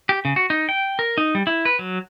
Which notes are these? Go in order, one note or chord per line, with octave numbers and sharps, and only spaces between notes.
G4
C#3
F#4
D#4
G5
A#4
D#4
G3
E4
B4
F#3